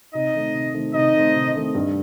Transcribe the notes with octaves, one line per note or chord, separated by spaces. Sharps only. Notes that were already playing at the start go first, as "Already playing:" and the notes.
C3 D#4 D#5
D#3 A3 C4
C3
D#3 A3 C4
C3 D#4 D#5
D#3 A3 C4
C3
D#3 A3 C4
G2